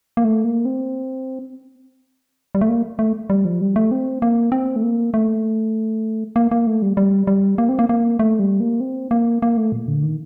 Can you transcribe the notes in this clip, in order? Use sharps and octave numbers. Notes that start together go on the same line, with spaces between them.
A#3
A3
A#3
C4
G3
A3
A#3
A3
G3
F3
G3
A3
C4
A#3
C4
A3
A#3
A3
A#3
A#3
A3
G3
G3
G3
A#3
C4
A#3
A#3
A3
G3
A#3
C4
A#3
A#3
A3
A#2
D3
D#3